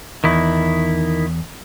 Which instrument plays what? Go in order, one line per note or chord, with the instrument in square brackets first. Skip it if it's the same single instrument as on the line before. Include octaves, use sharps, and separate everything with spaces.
[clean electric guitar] E2 [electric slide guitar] D#3 E4